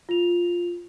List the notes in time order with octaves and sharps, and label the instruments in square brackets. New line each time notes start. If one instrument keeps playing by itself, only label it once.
[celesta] F4 F7